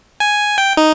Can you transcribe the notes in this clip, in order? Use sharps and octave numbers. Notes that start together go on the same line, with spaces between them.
G#5
G5
D#4